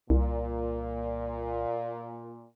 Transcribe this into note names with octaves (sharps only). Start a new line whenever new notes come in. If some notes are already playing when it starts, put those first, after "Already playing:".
C2 A#2